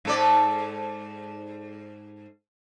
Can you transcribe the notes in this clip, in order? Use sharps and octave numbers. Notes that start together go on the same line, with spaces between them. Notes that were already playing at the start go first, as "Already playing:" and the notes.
G#2 A4 D5